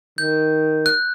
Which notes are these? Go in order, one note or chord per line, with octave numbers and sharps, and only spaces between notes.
D#3 G6
F#6